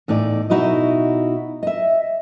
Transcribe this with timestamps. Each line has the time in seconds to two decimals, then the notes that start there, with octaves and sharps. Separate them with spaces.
0.08 E2 A2 D#4 D5
0.50 B2 D#4 E4 F#4 D#5
1.63 D#5 E5